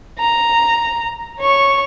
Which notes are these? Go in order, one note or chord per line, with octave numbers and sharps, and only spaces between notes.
A#5
C#5 C#6